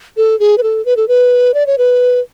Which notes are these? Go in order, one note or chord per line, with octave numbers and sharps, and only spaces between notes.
A4
G#4
B4
A4
B4
A4
B4
D5
C#5
B4